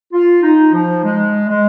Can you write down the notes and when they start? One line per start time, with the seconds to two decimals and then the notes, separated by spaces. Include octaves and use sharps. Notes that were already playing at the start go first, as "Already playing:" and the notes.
0.12 F4
0.43 D#4
0.73 F3
1.03 G#3
1.48 G#3